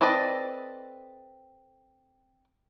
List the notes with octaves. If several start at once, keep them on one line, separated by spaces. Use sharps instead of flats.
C4 A4 B4 D5 D#5